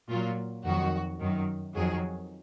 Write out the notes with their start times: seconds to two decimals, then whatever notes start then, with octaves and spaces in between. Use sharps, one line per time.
0.09 A#2 F#3 F4
0.64 F2 D#3 F#3 F#4
1.20 F#2 D#3 F#3
1.75 F2 D#3 F#3 G#4